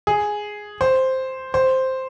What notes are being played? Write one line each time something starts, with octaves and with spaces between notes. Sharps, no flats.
G#4
C5
C5